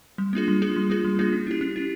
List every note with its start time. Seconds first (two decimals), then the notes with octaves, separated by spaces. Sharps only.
0.18 G3
0.33 A#3 D4 F4 G#4
0.48 G3
0.62 A#3 D4 F4 G#4
0.76 G3
0.90 A#3 D4 F4 G#4
1.04 G3
1.19 A#3 D4 F4 G#4
1.33 C#4
1.47 E4 G4
1.61 C#4
1.76 E4 G4